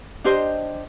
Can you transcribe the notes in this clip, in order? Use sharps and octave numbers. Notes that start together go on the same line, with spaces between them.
D4 G4 C5 D#5